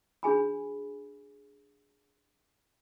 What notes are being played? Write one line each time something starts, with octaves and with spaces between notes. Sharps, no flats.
D4 F#4 G#4 G#5 B5